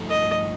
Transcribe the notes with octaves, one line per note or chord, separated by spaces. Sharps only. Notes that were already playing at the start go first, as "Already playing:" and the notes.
Already playing: G2 F3 A3 D#4 A4
D#5